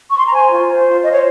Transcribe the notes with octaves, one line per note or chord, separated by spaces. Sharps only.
C#6
C6
A#5
C5 G#5
F4
C5
F4
C5 D#5
C#5